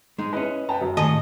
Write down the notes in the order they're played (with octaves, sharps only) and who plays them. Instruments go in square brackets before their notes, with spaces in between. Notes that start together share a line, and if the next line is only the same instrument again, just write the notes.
[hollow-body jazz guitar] G#3 D#4
[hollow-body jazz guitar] C#4 E4 [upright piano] B4 D#5
[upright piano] B4 G5 A5 [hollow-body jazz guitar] A#5
[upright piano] F#2
[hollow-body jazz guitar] A2 D#3 [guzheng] D#5 [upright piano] G#5 A5